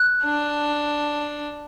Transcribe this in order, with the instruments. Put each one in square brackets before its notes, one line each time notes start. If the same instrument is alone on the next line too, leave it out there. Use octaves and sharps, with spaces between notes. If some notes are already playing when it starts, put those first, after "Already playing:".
Already playing: [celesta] F#6
[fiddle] D4